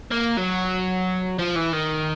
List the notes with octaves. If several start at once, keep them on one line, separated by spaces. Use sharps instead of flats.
A#3
F#3
F3
E3
D#3